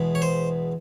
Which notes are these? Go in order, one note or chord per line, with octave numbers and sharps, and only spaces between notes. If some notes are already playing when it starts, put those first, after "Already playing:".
Already playing: E2 B2 G#3 B3
C#5
C5